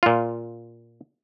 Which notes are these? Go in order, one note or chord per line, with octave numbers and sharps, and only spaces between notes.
A#2 F4